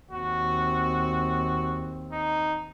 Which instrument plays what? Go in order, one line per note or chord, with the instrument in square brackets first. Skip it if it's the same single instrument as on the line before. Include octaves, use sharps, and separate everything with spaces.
[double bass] D#2 C4 [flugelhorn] F#4
[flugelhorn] D#4